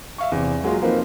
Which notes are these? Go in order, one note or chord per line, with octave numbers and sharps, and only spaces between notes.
E5 F5 C#6
E2 C3
F#3 G#3 A#3 F4
F3 A#3 C4 D#4 A#4 B4